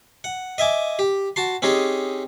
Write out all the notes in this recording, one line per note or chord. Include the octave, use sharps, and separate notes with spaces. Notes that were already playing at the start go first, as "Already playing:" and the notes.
F#5
D#5 E5 G#5 D6
G4
F#4 A5 C6
C4 C#4 D#4 G4 G#4